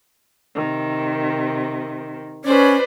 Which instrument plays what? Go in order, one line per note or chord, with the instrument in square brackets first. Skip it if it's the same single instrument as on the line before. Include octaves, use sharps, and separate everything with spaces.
[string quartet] C3 D#3
[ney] C#4 [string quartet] B4 C5 D5